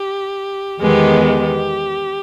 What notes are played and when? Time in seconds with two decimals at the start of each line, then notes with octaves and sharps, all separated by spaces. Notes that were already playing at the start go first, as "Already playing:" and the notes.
Already playing: G4
0.81 E2 D#3 G#3 B3 G4
1.27 G4